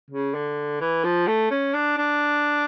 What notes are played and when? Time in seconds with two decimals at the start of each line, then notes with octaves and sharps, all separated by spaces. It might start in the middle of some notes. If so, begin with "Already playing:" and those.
0.10 C#3
0.34 D3
0.81 E3
1.04 F3
1.27 A3
1.51 C#4
1.74 D4
1.98 D4